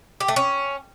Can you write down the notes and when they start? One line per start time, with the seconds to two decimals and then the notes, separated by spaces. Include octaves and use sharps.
0.20 G4
0.28 A3
0.36 C#4